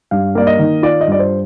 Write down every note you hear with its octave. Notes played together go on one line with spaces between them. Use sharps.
G2 F5
A#3 D5
D#5
D#3
F4 D5
D#5
G2 D5
C5